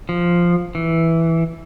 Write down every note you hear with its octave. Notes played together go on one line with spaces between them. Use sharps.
F3
E3